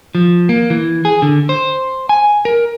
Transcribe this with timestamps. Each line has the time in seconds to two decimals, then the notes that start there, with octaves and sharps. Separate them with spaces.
0.15 F3
0.49 A#3
0.70 E3
1.05 G#4
1.22 D3
1.49 C5
2.09 G#5
2.45 A#4